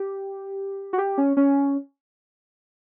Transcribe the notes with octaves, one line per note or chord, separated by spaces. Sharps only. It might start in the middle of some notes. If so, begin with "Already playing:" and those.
Already playing: G4
F#4
G4
C#4
C#4